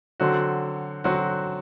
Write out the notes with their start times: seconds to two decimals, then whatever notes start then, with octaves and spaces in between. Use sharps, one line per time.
0.20 D3 F#3 C4 F#4
1.04 D3 F#3 C4 F#4